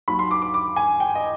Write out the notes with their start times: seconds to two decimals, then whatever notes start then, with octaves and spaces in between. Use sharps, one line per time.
0.08 D#2 D#3 F#3 B5
0.19 C6
0.31 D6
0.42 D6
0.54 D6
0.76 G#5
1.00 G5
1.15 D#5